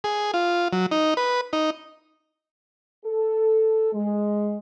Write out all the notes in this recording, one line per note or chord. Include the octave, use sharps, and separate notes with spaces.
G#4
F4
F#3
D#4
B4
D#4
A4
G#3